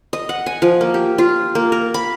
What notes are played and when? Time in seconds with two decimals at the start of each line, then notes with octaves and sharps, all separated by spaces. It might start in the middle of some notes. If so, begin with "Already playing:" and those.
0.13 D#5
0.29 F#5
0.46 G#5
0.62 F3
0.81 A#3
0.94 G4
1.18 F4
1.55 A#3
1.72 A#4
1.94 B5